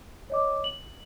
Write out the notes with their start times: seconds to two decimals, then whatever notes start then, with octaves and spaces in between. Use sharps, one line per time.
0.30 C#5 D#5 D6
0.64 F#7